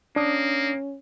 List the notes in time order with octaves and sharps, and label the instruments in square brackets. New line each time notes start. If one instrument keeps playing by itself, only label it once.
[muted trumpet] A#3 [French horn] C#4 [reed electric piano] D4 D#6